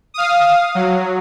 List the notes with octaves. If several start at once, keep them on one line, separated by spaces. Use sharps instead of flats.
F5 D#6
F#3